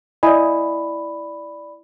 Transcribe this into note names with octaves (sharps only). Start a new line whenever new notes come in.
E4 D5 D#5 G#5 B5